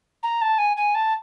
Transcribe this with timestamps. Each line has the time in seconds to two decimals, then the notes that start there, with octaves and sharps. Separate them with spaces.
0.23 A#5
0.41 A5
0.58 G#5
0.77 G#5
0.95 A5